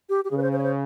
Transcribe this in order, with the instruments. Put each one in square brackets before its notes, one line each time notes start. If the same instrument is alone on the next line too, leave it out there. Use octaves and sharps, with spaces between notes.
[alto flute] G4
G4
[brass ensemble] C#3 [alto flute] G#4
[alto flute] B4
C5
C5
C#5
C5